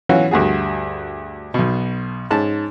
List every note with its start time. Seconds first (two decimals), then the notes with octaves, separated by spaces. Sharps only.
0.09 E3 F#3 C#4 F4 F#4
0.31 D2 G2 F#4 G#4
1.54 B1 B2
2.31 G#2 C#4 A5